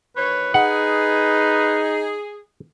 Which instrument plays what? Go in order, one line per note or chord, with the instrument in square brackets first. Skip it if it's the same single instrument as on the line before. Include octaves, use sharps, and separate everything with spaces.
[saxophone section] D2 D#3 C#5 [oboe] B4
[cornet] D#4 [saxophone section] G#4 [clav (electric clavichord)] F#5